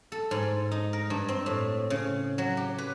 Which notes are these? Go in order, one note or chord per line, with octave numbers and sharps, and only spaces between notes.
A4
G#2
D#4
A#4
G2
C4
A2
C#3
F#3
G4
B4